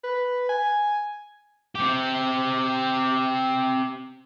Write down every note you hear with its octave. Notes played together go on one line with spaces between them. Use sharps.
B4
G#5
C4 G4